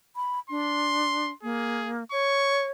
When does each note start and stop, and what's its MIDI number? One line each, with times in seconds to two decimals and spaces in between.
0.16 0.39 83
0.50 1.31 62
0.50 1.34 84
1.43 2.04 58
1.43 1.92 68
2.12 2.71 73
2.12 2.71 85